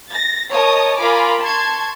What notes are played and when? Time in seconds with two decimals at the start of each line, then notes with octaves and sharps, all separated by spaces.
0.11 A6 A#6
0.52 A#4 C#5 D#5 A5 D#6
0.98 F4 A#4 G#5 B5 D6
1.41 A5 C6 C#6 G#6